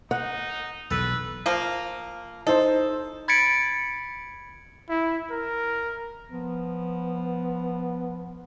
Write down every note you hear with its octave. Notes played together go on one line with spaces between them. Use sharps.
D#4 F#5
B1 E2 B2 A4 B4
F3 A#3
D#4 A4 C5
B5 G#6 A6 B6 C#7 D7
E4
A#4
F3 B3